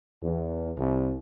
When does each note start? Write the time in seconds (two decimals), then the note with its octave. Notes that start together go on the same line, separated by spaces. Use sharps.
0.22 E2
0.77 C2